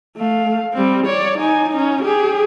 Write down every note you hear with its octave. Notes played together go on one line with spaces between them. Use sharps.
A3 F5
G3 C4
C#5 D5
D#4 G#5
C#4 D#4
G4 G#4